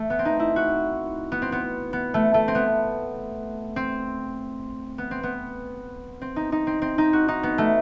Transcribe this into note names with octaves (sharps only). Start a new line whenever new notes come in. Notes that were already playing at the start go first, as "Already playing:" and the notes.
Already playing: A3
B3
C4
D#4
E4
F#4
B3
C4
B3
B3
A3
A3
C4
B3
C4
B3
C4
B3
C4
D#4
D#4
C4
C4
D#4
F#4
D#4
B3
A3